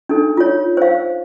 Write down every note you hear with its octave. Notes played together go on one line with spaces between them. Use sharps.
D4 D#4 A4
F4 C#5
C5 F5